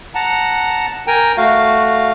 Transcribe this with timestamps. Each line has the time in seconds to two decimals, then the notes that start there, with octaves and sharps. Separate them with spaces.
0.15 F#5 A5 A#5
1.07 A#4 G5 G#5 A#5
1.37 A3 F#4 F5